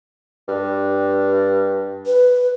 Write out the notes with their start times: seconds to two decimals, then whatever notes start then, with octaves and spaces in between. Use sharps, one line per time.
0.49 G2
2.06 B4